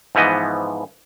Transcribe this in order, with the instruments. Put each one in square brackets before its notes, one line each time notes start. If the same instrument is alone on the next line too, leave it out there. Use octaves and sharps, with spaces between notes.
[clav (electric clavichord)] G#2 E3 F3 B3 D#5